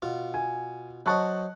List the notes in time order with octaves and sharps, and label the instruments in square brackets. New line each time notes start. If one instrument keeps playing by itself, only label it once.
[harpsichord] B2 F4
[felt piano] G#5
[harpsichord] F#3 C5 D#5 [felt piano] A5 C#6 F#6